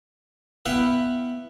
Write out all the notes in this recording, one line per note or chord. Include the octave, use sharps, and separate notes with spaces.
B3 E4 B4 E5 F5 G5